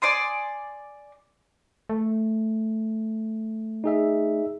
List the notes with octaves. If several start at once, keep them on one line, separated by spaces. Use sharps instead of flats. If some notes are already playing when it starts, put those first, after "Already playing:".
D5 G#5 C6 D#6
A3
D#4 G#4 E5